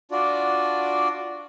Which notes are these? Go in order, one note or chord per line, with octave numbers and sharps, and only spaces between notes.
D4 F4 F#4 D5